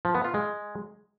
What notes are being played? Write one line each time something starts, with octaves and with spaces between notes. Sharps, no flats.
F3
B3
F4
G#3